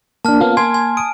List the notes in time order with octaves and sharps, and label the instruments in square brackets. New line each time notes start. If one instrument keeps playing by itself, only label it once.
[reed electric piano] A#3 D4 [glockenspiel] A5 F6
[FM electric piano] A#3 B3 C#4 [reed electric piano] F4 F5
[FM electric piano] A#3 G#6 [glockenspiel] G#5 [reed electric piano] C6
[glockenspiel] G#5
[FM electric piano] D#6 [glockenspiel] D7